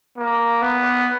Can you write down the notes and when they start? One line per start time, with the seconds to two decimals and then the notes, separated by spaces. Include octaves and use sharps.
0.17 A#3
0.62 B3